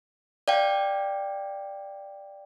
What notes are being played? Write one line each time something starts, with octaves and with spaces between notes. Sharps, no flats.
D5 F5 G5